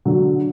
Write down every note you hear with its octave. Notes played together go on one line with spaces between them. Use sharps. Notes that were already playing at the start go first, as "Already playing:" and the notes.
D3 F#3